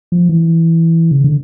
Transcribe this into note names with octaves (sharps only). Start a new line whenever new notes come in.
F3
E3
C#3
D3